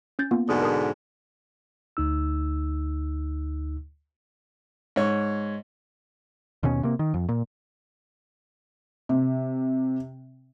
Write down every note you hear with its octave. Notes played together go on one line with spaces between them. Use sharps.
C#4 G6 A6
A#3 B3 F4
G#2 B2 D3 G#4 D#6
A#4 A5 D#6
D2 D#4 E6
G#2 C#5
D#2 B2 C#4
C3 A#3
D#3
F2
A#2
C3